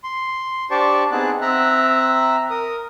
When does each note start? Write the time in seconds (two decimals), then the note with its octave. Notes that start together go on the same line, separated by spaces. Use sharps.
0.04 C6
0.71 D4 G4 C5 D5 A5 C#6
1.12 B3 C4 D#4 G#4 A5 F#6
1.41 C4 E5 A#5 E6 F#6
2.50 A#4 D#6